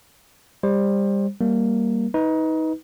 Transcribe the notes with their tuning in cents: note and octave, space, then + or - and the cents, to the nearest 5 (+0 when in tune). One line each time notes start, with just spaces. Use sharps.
G3 +25 C5 +25
G3 +0 A#3 +0 A#4 +0
D#4 +25 B4 +0